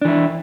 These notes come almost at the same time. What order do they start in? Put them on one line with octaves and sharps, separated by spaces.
D4 E3 E4